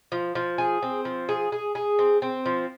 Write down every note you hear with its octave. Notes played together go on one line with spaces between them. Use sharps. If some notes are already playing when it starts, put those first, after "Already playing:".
F3
F3
G#4
C4
F3
G#4
G#4
G#4
C4
C4
F3